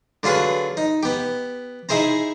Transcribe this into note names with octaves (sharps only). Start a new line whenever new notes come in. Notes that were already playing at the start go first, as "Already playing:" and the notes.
D3 F#3 F4 G#4 B4
D#4
B3 G4
D#4 E4 G#4 C5 A#5